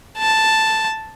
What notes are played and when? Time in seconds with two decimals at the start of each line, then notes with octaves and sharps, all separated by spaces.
0.18 A5